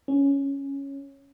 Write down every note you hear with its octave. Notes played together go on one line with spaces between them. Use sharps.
C#4